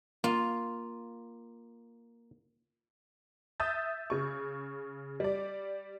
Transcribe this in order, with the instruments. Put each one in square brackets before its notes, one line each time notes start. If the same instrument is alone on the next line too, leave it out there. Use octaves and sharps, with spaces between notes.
[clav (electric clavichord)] A#3 [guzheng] F4
[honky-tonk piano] E5 D#6 E6 G6 A6
C#3 C#6
G3 D5